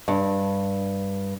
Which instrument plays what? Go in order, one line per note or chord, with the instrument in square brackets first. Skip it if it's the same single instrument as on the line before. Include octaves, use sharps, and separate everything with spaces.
[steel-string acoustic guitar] G2